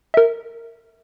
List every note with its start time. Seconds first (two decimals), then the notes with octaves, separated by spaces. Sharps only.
0.14 A#4 E5